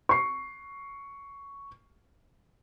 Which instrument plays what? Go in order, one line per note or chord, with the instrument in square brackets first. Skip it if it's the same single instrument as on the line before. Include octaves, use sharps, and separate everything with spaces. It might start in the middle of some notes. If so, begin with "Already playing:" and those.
[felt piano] C#6 C7